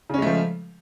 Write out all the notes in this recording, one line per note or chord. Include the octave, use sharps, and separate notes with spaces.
C#3 F3 G#3 A3 C#4